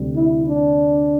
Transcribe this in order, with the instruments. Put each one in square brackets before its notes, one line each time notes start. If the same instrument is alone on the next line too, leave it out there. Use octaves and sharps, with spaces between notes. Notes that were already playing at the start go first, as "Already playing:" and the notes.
Already playing: [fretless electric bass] D2 C3 G3
[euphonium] E4
D4